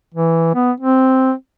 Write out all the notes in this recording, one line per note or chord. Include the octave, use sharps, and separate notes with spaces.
E3
B3
C4